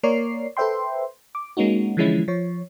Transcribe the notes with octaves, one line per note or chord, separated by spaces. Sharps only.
A#3 A#4 C#5 D5 C7
A4 B4 C5 E5 G5 C6
D6
G#3 A#3 C#4 D#4 F#4
D3 E3 F3 G#3 C#4 E4
F3 C#5